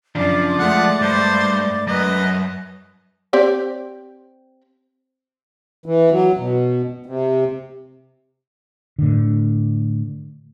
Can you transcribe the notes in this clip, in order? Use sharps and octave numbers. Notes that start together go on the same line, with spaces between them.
F#2 C#3 F3 D4 D5 D6
G#3 A3 F#5
G2 C5
F#2 B4 D#5
C4 G4 D5
E3
F#3
B2
C3
A2 D3